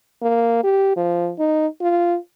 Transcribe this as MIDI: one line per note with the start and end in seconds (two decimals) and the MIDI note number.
0.22 0.59 58
0.64 0.95 67
0.97 1.32 53
1.39 1.67 63
1.81 2.17 65